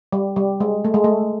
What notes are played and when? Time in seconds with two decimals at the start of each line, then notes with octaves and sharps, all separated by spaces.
0.13 G3
0.36 G3
0.60 G#3
0.85 A3
0.94 G#3
1.04 A3